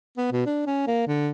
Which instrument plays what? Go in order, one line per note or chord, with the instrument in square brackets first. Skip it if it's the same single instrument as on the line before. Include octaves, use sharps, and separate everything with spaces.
[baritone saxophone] B3
B2
D4
C#4
A#3
D3